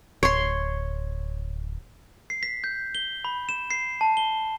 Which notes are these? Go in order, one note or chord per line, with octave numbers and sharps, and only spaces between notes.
D1 C#5 C6
C7
B6
G6
G7
B5
E7
C7
A5
G7